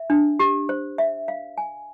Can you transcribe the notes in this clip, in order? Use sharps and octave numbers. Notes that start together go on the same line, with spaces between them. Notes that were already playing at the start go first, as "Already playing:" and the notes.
Already playing: E5
D4
G4
C5
E5
F5
G#5